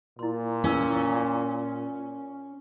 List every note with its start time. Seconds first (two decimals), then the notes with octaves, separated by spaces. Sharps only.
0.19 A#2 E4 C6
0.64 C#4 E4 B4 E6